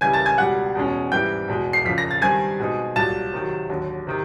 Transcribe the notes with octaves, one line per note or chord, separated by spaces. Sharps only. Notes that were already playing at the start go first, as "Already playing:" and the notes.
C#3 E3 G3 G#5 G#6
A5 A6
G#5 G#6
C#2 B2 G3 F#5 F#6
E2 B2 G#3 C#4
G#2 E3 G3 G5 G6
E2 B2 G#3
C7
F2 C#3 F3 B6
A#6
A6
G2 D#3 G3 C4 G#5 G#6
B2 G#3 C4 D#4
C2 A#2 F#3 A5 A6
C3 D#3 F#3
D#2 D3 F#3
C3 D#3